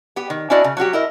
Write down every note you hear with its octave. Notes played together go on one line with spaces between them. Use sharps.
B3 G4
D#3
C#4 D4 E4 F#4 D5 D#5
C#3
F#3 C#4 F#4 G4
E4 A#4 D#5